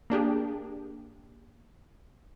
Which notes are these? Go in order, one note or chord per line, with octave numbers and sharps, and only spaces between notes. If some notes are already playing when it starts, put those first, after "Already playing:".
A#3 D4 G4 G#4